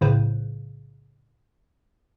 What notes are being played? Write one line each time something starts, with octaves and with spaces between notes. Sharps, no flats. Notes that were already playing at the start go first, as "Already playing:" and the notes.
B1 A2 C#3 B4 C5